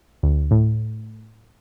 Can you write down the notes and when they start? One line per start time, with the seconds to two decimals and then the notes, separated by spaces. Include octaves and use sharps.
0.23 D2
0.51 A2